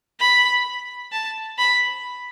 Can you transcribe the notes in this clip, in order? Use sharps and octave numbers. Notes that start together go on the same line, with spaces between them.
B5
A5
B5